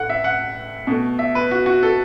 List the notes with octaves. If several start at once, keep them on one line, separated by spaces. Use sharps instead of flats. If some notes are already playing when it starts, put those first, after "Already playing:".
Already playing: A2 A3 F#5
E5
F#5
B2 A3
E5
B4
F#4
F#4
A4